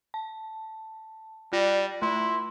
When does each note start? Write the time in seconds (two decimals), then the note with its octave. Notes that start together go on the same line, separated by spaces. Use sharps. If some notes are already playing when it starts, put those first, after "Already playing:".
0.14 A5
1.53 G3 F4 D5 A#6
2.02 A3 E4 F4 C6